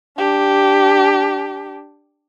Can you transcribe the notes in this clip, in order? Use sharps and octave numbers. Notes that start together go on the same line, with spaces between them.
D4 G4